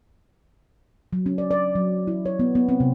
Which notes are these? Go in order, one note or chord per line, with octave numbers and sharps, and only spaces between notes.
F#3
C#4
D5
D5
F#3
E4
C#5
B3
B3
C4
C3